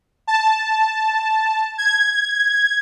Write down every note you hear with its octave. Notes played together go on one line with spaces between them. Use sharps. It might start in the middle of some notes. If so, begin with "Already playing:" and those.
A5
G#6